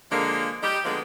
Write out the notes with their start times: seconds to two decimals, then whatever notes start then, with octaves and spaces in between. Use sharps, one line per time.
0.11 D3 F3 G#3 A#3
0.63 G3 D#4 G4
0.84 D3 F3 G#3 A#3 B3